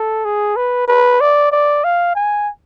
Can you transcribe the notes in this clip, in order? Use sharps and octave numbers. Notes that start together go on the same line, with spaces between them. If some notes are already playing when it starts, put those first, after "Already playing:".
Already playing: A4
G#4
B4
B4
D5
D5
F5
G#5